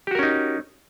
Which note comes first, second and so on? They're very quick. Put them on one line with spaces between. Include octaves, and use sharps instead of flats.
G4 F#4 A#4 C#4 D#4